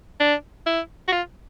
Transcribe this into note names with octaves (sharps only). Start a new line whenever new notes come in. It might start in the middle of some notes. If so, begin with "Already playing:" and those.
D4
E4
F#4
F4